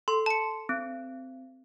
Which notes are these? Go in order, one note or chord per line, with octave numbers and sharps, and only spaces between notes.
A4 C6
A5 C#7
C4